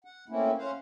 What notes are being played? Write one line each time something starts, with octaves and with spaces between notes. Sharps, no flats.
F#5
A3 A#3 C4 C#4 E4
C#4 C5 F5 F#5